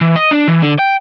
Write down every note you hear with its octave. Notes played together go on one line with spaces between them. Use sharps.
E3
D#5
D4
E3
D3
G5